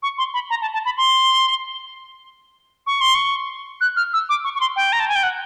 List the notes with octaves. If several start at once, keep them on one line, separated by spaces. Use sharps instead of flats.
C#6
C6
B5
A#5
A5
A5
B5
C6
C#6
C6
C#6
F#6
F6
E6
D6
C#6
C#6
C6
G5
A#5
A5
G#5
G5
F#5